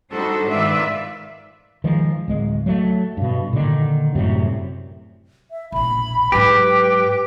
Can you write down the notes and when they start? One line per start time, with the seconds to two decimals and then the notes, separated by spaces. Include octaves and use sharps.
0.13 G3 D4 D#4 F#4 A4 C5
0.50 G#2 D#3 F4 B4 D5 E5
1.84 D#3 F3 G#3
2.28 D1 G#3
2.66 F#3 A3
3.17 G2 B2
3.53 A#2 D3 D#3
4.15 F#2 A2 C3 G3
5.51 E5
5.72 E1 A#1 B5
6.32 G#2 F#3 G4 B4